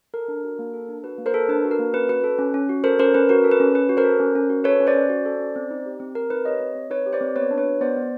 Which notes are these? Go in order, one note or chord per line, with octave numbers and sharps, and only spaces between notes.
A4 A#4
D4
F#4
A#3
A4
D4
F#4 B4
A#3
A#4 C5
A4
D4 B4
F#4
A#4
A#3
C#4 B4
F#4 B4
A4
C#4
C#4
F#4
A4 A#4 C5
C#4 A#4 C5
C#4 B4
F#4 A#4
A4
B4
C#4
C#4 B4
F#4
A#4 C5
A4
C#4
C#4
F#4
A4 B4 C#5
C#4
C5 D5
C#4
F#4
A4
C#4
C4
D#4
G4
C4
C4 A#4
D#4 B4
G4 C#5 D#5
C4
C4
D#4 B4 C#5
G4
C5 D5
C4
B3 B4 C#5
D4
B4 C#5
F#4
B3 C5 D5
B3